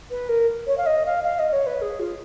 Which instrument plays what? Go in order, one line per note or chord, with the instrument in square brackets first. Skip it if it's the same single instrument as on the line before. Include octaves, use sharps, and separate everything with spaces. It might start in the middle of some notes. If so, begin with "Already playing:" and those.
[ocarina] B4
A#4
C#5
F5
D#5
F5
F5
D#5
C#5
B4
G#4
F4